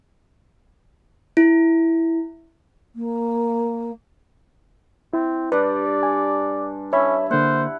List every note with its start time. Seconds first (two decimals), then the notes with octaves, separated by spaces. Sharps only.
1.37 E4
2.95 A#3
5.13 C4 E4
5.52 G2 D4 B4 D5
6.03 G#5
6.93 C#4 E4 C#5 E5 B5
7.31 D3 A#3 C5 F#5